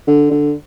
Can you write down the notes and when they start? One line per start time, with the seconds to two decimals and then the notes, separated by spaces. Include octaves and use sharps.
0.07 D3
0.30 D3